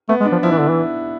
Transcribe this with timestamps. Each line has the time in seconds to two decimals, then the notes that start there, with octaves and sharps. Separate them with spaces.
0.09 A3 B3
0.21 G#3
0.25 D4
0.32 F3
0.43 F3 E4
0.51 E3 D4
0.60 D3 E4
0.69 E3